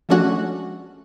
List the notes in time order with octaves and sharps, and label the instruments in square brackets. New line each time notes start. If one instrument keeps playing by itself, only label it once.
[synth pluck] F3 G#3 A3 C#4 D4 F#4